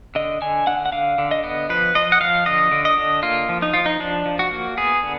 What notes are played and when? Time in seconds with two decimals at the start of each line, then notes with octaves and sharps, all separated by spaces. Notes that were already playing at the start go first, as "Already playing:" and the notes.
0.15 D3 D#5
0.41 D3 G#5
0.67 D3 F#5
0.86 F#5
0.92 D3 F5
1.18 D3
1.31 D#5
1.44 B3
1.70 F3 B4
1.95 F3 D#5
2.12 F#5
2.21 F3 F5
2.46 D3 D#5
2.72 D3
2.85 D#5
2.97 D3
3.23 A#3 F4
3.49 F3
3.62 D#4
3.73 F3 F4
3.86 D#4
4.00 F3 D4
4.26 F3
4.39 F#4
4.51 A#3
4.77 B3 G#4
5.03 D3